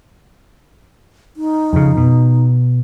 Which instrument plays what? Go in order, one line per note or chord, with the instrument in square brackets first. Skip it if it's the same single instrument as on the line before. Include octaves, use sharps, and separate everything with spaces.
[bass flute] D#4
[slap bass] F2 C#3
B2